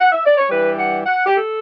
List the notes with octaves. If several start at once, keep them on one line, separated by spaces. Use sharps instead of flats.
F#5
E5
D5
C#5
G2 E3 G3 B4
F#5
F#5
G4
A4